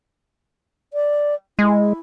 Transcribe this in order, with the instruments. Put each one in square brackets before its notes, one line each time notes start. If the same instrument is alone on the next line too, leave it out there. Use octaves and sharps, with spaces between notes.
[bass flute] D5
[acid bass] G#3 [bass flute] E4